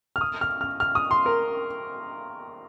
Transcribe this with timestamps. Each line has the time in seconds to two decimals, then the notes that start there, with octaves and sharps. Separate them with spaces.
0.16 F6
0.21 D#6
0.41 F6
0.61 F6
0.80 F6
0.95 D#6
1.11 C6
1.26 A#4